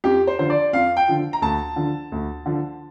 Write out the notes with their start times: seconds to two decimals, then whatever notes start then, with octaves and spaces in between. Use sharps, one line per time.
0.04 F2 G4
0.27 C5
0.39 D3 F3 C5
0.50 D5
0.73 F2 F5
0.97 G5
1.08 D3 F3
1.33 A#5
1.42 D2 A5
1.76 D3 F3
2.12 D2
2.46 D3 F3